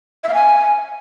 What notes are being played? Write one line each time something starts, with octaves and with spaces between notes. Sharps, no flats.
E5
F5
G#5